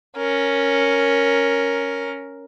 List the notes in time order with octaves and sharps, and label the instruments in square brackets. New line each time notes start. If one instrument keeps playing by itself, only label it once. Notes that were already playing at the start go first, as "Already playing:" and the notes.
[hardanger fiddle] C#4 A#4